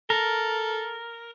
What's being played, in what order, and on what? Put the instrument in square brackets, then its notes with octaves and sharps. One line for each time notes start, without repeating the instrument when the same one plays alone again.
[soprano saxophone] A4 [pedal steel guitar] A#4